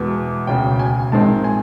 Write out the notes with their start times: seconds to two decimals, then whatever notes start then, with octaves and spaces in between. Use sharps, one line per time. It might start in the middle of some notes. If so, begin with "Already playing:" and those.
Already playing: E2 B2 G#3 B3
0.47 E1 D2 C#3 G5
0.79 G#5
1.12 A#1 G#2 D#3 G#3 C4 A5
1.44 G#5